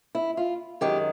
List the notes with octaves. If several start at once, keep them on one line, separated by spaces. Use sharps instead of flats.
E4
F4
F#2 D#3 G#3 G4